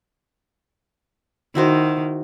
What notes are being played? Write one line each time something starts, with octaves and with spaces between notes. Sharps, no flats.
D#3 E4 F#4 C5